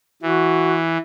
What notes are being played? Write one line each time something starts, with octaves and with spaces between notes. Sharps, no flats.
E3 F#4